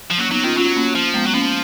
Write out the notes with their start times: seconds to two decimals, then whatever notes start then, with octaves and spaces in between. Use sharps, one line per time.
0.10 F3
0.18 F#3 A#3 C#4
0.31 F#3 B3 D#4
0.44 D#3 C#4 F4
0.57 F#3 C#4 F4
0.76 A#3 C#4
0.95 F3
1.14 G#3 B3
1.27 F#3
1.34 F3 A#3 C#4